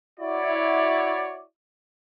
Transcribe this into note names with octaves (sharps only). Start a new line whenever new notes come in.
E4 F#4 C#5 D5